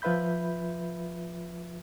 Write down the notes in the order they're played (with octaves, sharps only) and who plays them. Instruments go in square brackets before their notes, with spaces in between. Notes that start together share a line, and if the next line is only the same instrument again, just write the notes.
[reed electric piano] F3 F4 B4 E5 B5 G6